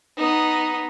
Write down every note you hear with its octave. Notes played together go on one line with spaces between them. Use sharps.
B3 D#4